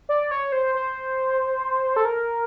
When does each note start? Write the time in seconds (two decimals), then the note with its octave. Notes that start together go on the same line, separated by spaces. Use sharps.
0.09 D5
0.31 C#5
0.52 C5
0.75 C5
1.96 A4
2.05 A#4